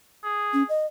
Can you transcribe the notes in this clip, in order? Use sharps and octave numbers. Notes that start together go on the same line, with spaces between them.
G#4
C#4
D#5